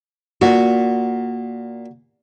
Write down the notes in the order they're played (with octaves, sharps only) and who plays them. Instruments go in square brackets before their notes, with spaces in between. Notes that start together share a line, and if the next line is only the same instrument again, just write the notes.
[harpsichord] A#2 [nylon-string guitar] F#4